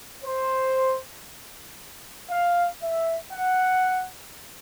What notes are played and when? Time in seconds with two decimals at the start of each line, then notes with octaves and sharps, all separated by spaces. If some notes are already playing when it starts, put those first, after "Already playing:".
0.23 C5
2.29 F5
2.81 E5
3.32 F#5